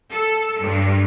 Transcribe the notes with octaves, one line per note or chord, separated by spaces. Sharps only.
A4
G2